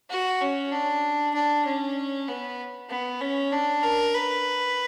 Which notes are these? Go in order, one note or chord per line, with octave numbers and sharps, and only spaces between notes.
F#4
C#4
D4
D4
C#4
B3
B3
C#4
D4
A#4
B4